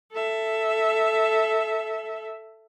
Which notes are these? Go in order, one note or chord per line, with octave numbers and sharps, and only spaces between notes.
A4 E5